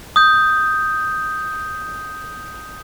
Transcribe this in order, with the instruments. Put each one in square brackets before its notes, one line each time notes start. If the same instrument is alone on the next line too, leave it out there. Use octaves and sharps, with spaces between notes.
[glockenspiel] D#6 G6